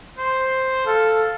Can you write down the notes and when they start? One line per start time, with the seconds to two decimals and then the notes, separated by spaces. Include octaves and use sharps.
0.18 C5
0.86 A4 F5